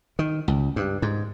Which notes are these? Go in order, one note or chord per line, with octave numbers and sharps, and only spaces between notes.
D#3
C#2
G2
G#2